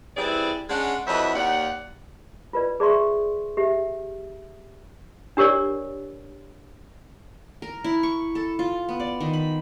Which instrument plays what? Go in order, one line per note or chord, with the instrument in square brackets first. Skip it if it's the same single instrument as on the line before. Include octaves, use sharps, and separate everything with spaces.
[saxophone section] E3 G3 C4 E4 G#4 D5
G#3 C#4 D4 F#5
F2 E3 F#3 D#5 E5 F#5
D#2 D5 F#5
[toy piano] F4 B4 D5
G#4 D5 E5 C6 C#6
G4 E5
D4 G4 A#4 C#5 D5
[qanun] A#4
E4
C#6
A4
F4
B3
D5
D#3
B5